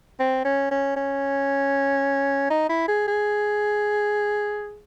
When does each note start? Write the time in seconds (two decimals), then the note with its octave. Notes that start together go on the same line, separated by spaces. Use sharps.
0.20 C4
0.45 C#4
0.71 C#4
0.96 C#4
2.50 D#4
2.69 E4
2.88 G#4
3.08 G#4